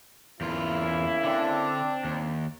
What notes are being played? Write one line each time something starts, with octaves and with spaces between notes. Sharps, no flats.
E2 C#3 A#3 E4 F4
D3 C4 D4
D#2